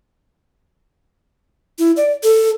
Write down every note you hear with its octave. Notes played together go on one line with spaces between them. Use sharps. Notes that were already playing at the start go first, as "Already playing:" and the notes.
E4
D5
A4